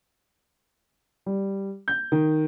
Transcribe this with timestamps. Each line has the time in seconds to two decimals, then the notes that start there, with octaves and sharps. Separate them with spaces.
1.26 G3
1.88 G6
2.12 D#3